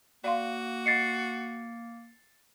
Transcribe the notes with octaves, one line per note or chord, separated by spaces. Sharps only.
A#3 F#4 D5 F5 C6
D#5 F#5 A6 C7 C#7